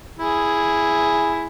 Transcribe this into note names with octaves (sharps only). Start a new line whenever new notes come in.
E4 G#4